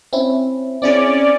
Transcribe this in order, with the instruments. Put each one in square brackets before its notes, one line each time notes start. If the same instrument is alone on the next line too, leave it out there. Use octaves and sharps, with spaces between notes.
[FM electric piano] C4 C#4 E4
[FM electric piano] C4 E4 G#4 [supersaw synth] C#4 D5